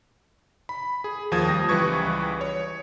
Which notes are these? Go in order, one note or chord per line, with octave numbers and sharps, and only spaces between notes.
B5
G#4
D#2 F3 D#6 G#6
F3 G3 A#6
C#2 E3 G3 B4 C#6 G#6
C#5